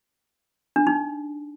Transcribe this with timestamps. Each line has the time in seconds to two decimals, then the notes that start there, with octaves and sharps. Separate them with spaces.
0.76 D4
0.87 D#4